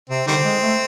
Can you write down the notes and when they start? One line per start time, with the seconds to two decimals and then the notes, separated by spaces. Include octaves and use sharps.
0.10 C3 C4
0.27 D3 D#3 G3 C4
0.44 G#3
0.62 A3